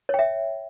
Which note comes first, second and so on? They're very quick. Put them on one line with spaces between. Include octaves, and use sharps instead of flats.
C#5 G5 E5